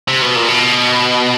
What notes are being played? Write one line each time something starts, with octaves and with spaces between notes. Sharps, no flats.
C3
B2
A#2
B2